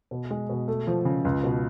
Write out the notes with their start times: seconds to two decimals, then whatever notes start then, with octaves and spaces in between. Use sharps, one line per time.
0.11 B2
0.31 G#3
0.49 B2
0.68 A3
0.87 F3
1.05 C#3
1.25 C#2
1.44 B2